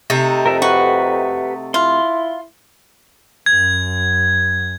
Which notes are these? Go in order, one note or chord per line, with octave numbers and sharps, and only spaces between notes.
C3 A3 D#4
F2 A#4 E5
F#4 G4 B4 F#5
E4 F4 C6
F#2 G#6